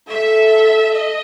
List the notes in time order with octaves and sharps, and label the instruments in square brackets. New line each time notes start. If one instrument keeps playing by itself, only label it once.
[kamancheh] A4 [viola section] E5
[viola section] D#5